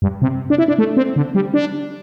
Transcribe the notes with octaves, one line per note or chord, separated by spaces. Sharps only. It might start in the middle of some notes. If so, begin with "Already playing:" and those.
G2
C3
D4
E4
D4
A3
C4
D3
G3
D4